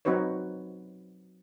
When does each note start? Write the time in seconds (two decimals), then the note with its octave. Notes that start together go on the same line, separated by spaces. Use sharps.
0.05 F#3 C4 D#4 F#4 B4 C#5